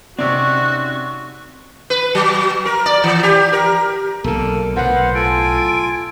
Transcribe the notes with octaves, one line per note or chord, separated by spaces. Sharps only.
C3 C4 C#4 D#4 F#4 D5 C#6
B4
F#3
A#4
D5
E3
G4
A#4
B1 D3 A#3 A4
B1 A2 B3 C5 F5 F#5 C6
F4 A4 G#5 D7